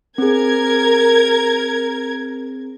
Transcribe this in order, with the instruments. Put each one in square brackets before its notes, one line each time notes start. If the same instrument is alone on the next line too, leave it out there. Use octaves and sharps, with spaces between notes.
[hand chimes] C4 G#4 [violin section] A#4 G#6